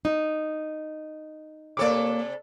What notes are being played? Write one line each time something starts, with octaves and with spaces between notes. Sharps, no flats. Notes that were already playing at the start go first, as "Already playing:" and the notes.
D#4
C3 A#3 A4 C#5 D5 D6